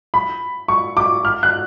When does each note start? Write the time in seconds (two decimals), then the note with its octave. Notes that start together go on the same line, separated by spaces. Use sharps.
0.14 B5
0.68 C#6
0.97 D6
1.25 F6
1.43 F#6